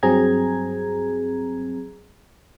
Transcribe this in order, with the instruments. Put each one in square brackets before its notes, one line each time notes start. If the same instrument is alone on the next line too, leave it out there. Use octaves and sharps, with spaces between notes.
[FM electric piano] G2 F#3 C4 G#4 A#5 G#6